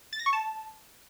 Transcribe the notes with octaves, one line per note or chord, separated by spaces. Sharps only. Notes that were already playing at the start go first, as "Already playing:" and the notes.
A6
A#6
C#6
A5